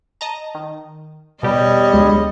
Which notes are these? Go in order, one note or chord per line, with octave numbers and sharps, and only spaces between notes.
D#5 A5 A#5
D#3
E2 B2 G3 G4 C#5 D#5
D2 G#3